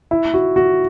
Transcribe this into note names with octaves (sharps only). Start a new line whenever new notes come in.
E4
F#4
F#4